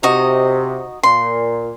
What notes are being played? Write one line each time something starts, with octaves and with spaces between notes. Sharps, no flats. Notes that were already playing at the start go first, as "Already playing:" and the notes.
C3 D#4 F#4 D#5
A#2 C6